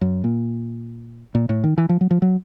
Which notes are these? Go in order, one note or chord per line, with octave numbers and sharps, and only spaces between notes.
F#2
A#2
A#2
A2
D#3
E3
F3
F#3
F3
F#3